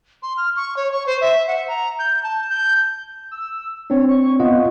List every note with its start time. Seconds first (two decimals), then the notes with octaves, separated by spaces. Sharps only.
0.22 C6
0.37 F6
0.56 C#6
0.76 C#5
0.92 C#6
1.06 C5
1.21 E5
1.47 F#5
1.68 A#5
1.99 G6
2.23 A5
2.49 G6
3.31 E6
3.90 C4 D4 C#5
4.09 C#6
4.40 B3 F4 D#5 F#5